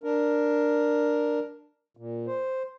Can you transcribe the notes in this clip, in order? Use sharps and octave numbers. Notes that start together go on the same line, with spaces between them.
D4 A#4
A#2
C5